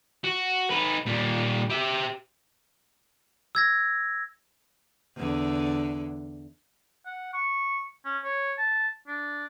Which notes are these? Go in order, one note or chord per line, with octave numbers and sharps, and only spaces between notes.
F#4
D#4 B4
A#2 G3
G4 E5
E6 G#6 A#6
E2 D3
F#5
C#6
C#4
C#5
A5
D4